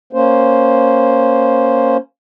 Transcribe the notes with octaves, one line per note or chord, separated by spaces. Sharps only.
A#3 C#4 C5